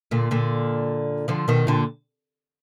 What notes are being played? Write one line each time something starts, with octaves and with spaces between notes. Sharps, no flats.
A#2 D3
A#2 D3
D3 F3
B2 D#3
A#2 D3